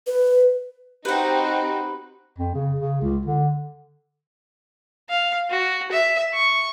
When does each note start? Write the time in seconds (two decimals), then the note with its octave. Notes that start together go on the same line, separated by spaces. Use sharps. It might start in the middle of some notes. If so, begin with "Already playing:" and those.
0.07 B4
1.05 C4 D#4 F#4 G4 B4 F#5
2.38 F2
2.55 C#3
2.79 C#3
3.02 C#2
3.26 D3
5.09 F5
5.50 F#4
5.92 E5
6.33 C#6